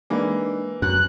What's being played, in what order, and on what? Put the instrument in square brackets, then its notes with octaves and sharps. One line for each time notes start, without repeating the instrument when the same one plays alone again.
[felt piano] E3 A#3 [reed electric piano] G#3 D4 D#4
[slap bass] F#2 [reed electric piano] F#4 [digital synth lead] F#6